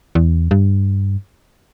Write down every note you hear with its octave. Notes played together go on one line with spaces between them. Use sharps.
E2
G2